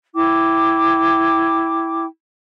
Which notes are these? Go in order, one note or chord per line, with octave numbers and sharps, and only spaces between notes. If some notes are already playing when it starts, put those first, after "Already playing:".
E4 G5 D6